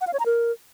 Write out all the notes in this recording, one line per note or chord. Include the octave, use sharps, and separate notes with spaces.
F#5
F5
C#5
A#5
A#4